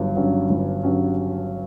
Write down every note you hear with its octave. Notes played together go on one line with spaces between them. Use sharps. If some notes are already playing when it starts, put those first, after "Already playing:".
Already playing: G1 G2 F#3
G2 F#3 C#4
G1
G2 F#3 C#4